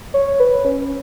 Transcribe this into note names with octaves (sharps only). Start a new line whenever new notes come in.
C#5
B4
C#4